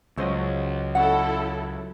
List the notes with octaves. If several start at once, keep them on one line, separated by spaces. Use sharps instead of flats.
C#2 F#3 C#4 C5 D#5 E6
C#4 E4 A4 F#5